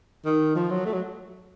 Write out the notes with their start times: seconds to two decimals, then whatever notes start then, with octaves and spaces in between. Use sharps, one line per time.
0.25 D#3
0.55 F3
0.70 F#3
0.86 A3
0.93 F#3